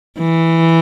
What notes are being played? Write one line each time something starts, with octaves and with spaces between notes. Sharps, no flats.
E3